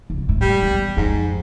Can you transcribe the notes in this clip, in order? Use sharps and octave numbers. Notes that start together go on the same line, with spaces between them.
C#2
A2
G3
E2
F2 G#2